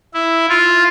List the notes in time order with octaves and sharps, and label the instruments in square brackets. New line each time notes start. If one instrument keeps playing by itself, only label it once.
[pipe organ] E4
F4